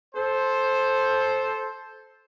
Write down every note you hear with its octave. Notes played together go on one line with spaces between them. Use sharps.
A4 C5